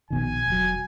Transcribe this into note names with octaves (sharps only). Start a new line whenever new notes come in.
A#1 B2 D#3 G#5
E1 F#3